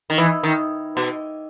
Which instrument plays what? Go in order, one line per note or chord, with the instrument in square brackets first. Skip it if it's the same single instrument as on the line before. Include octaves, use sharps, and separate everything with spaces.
[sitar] D#3
E3
D#3
B2